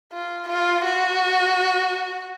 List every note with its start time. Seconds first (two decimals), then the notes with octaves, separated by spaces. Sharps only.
0.13 F4
0.48 F4
0.84 F#4